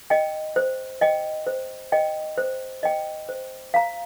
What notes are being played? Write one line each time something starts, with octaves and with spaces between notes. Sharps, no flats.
D#5 G5
C5
D#5 G5
C5
D#5 G5
C5
D#5 G5
C5
F5 A#5